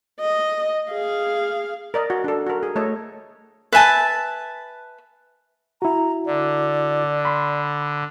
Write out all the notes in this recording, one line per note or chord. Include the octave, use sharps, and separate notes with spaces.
D#5
G#4 F5
A#4 D5 D#5
F#4
D4 A4
F#4 A#4
G#4
A3 A4 C#5 D#5
B4 E5 G#5 A5
E4 F#4 A#5
D3 D5
B5 C6